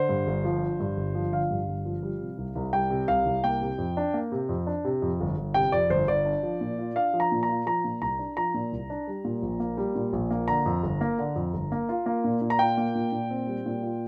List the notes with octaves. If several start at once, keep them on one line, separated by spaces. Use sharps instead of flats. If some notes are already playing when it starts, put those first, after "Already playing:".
Already playing: D3 C5
G2
G1
F3
D3
G2
G1
F3
D3 F5
G2
G1
F3
G3
C3
C2
C2
G3 G5
C3
C2 F5
C2
A#3 G5
C3
F2
D4
A#3
C3
F2
D4
C3
F2
G1
G1
C3 G5
F2 D5
G1 C5
G1 D5
D4
F3
A#2
F4
D4 F5
F3
A#5
A#2
A#5
F4
F3 A#5
A#2
C2 A#5
D4
F3 A#5
A#2
C2
D4
G3
A#2
A#1
A#3
G3
A#2
A#1
A#3
D3 A#5
F2
G1
A#3
D3
F2
G1
A#3
F4
A#3
A#2
A#2
A#5
F4 G5
A#3
A#2
A#2
C4
G3
A#2
F4